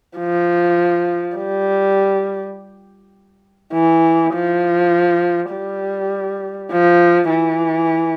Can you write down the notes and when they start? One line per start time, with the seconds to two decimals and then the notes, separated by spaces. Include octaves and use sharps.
0.18 F3
1.37 G3
3.73 E3
4.34 F3
5.52 G3
6.71 F3
7.29 E3